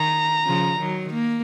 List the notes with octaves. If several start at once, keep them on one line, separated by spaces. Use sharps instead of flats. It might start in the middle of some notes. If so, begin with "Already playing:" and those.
Already playing: D#3 A#5
C#3 F3
D#3 F#3
A#3